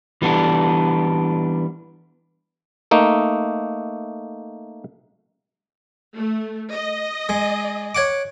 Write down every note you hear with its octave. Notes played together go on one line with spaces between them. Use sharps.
E3 G3 B3 D4
A3 A#3 D#4
A3
D#5
G#3
C#5 F#5 D6